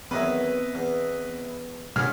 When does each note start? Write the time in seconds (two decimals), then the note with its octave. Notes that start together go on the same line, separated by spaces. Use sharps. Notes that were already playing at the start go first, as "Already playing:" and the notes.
0.11 E2 D#3 F#3 B3 C4 B4 D#5 E5
0.75 E2
1.96 G2 B2 C#4 F#4 G#4 F6